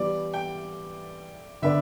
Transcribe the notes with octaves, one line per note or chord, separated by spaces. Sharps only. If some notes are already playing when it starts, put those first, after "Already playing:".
Already playing: E3 G3 B3 G4 D5
G5
D3 B3 D4 B4 D5 E5